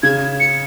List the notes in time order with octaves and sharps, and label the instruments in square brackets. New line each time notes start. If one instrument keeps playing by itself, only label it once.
[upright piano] C#3 [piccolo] G#6
[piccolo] C#7